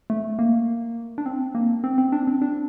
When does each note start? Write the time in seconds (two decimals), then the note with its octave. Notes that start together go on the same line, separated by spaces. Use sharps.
0.10 A3
0.39 A#3
1.18 D4
1.26 C4
1.55 A#3
1.84 C4
1.98 C4
2.12 D4
2.27 C4
2.42 D4